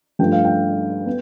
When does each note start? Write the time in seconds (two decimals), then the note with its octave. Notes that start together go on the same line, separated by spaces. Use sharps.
0.19 G2 F3 A3 G5
0.32 F5
0.45 G5
1.06 B3